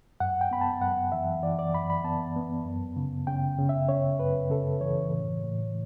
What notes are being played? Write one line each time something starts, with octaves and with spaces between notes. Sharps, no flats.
F#2 F#5
G5
B3 B5
A5
F#2 F#5
E3 E5
E3 D5
D5
F#2 B5
B5
B3 A5
B3
F#2
C#3
C#3 G5
C#3
E5
C#3 C#5
F#2 B4
C#3 A4
E3 C#5
A2
A2